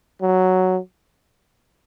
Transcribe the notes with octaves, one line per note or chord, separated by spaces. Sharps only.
F#3